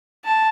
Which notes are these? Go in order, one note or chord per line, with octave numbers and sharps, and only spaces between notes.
A5